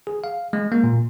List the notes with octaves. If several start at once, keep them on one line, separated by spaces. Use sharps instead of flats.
G#4
F5
G#3
A#3
A#2